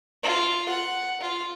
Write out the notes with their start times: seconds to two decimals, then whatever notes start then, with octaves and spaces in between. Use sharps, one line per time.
0.24 F4
0.69 F#5
1.21 F4